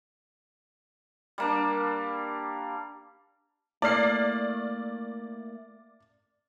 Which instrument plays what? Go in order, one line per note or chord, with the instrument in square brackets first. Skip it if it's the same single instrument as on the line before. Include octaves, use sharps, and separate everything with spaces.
[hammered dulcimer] G3 A#3 D4
[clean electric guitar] A3 A#3 E4 [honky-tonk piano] D5 F6 C7